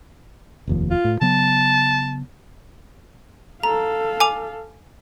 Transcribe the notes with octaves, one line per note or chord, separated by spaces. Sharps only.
F1 D#2 F3
F4
A2
C#3 F#3 B3 A5
A4 F5 A#5
G#5 D6 F7